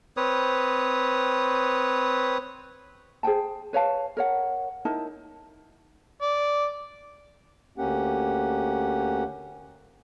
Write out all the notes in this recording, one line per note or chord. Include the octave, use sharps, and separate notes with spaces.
C4 B4 C#5 D#6
G#4 C5 G5 A5
B4 C#5 F5 A5
A#4 C#5 F#5
D#4 E4 A#4 A5
D5
D2 A#3 C#4 G4 F#5